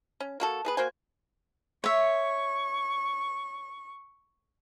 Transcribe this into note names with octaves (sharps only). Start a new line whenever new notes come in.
C#4
A#3 F#4 A4
B3 G#4 B4
A#3 F#4 C5 G#5
C#5 E5 C#6